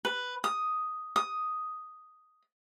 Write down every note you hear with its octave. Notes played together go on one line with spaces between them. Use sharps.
B4
D#6
D#6